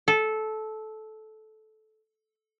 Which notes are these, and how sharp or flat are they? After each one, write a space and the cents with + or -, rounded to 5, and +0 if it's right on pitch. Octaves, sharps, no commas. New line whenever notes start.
A4 -15